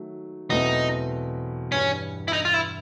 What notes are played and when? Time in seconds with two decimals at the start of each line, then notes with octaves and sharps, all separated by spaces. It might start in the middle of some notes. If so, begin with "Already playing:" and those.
Already playing: D#3 F#3 A3
0.50 E2 B2 F#3 A3 C4 D#4
1.72 G2 E3 G3 C#4
2.28 E4
2.33 D#4
2.45 F4
2.54 E4